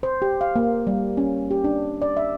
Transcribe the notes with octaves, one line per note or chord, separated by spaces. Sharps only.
C5
G4
F5
A#3
G3
C#4
G4
D4
D5
E5